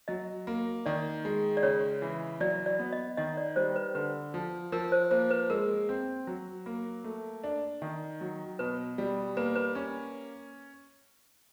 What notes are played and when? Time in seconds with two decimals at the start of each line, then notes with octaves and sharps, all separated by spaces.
0.08 F#3 D#5
0.47 A#3
0.86 D#3 D5
1.25 G#3
1.57 D5
1.63 C#3 C#5
2.02 E3
2.40 F#3 D5
2.66 D5
2.79 B3
2.92 D#5
3.17 D#3 D#5
3.37 D5
3.56 G3 C5
3.76 B4
3.95 D3 B4
4.34 F3
4.72 F3 A#4
4.92 C5
5.11 A#3 C5
5.31 B4
5.50 G#3 A#4
5.89 C4
6.27 F#3
6.66 A#3
7.04 A3
7.44 D4
7.82 D#3
8.21 F#3
8.59 B2 B4
8.98 G3
9.37 A#3 B4
9.56 B4
9.75 C#4